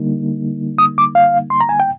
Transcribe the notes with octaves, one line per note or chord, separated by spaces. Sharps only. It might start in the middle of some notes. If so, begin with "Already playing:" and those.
Already playing: D3 G3 A#3 D#4
D#6
D6
F5
C6
A#5
G#5
G5